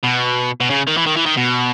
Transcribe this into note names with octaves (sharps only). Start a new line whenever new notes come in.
B2
B2
C#3
D#3
E3
D#3
E3
D#3
B2